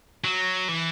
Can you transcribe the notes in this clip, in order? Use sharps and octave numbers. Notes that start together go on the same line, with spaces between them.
F#3
E3